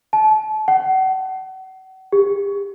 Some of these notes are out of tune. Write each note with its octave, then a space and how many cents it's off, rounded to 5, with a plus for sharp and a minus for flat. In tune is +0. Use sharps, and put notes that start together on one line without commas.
A5 -30
F#5 +35
G4 +35